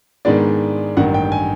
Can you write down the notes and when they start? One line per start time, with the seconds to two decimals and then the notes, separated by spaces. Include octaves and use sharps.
0.25 G#2 D#3 G#3 B3 D4 D5
0.97 A1 G2 D#3 F#5
1.14 G5
1.32 G#5